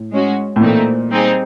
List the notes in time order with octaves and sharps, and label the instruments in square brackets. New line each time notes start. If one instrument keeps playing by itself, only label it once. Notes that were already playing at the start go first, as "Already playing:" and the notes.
Already playing: [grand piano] A2
[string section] G#3 C#4 F#4
[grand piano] A2
[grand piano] A#2 [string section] E3 A3 C4 D#4
[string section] G3 C4 D#4 G#4